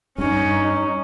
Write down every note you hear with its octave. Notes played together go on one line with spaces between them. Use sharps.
G2 C#4 D#4